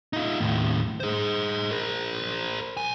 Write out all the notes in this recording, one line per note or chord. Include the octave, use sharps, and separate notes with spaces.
D#4 F4
D#2 A2
G#4 C5
A#4 C5
B1 G#5